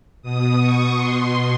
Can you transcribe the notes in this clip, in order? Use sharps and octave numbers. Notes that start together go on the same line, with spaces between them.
B2 D#6
C#6
B2 C6